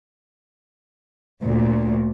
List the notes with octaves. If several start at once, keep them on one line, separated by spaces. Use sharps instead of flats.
D2 A#2